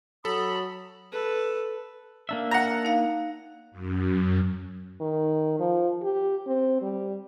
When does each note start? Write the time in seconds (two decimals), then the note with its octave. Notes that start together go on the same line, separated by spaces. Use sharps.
0.25 F#3 A4 B5 D#6
1.12 A4 B4
2.29 A#3 D4 E5
2.51 F#5 A#5
2.85 D#4 F5
3.71 F#2
5.01 D#3
5.60 F3
6.03 G4
6.47 C4
6.82 G3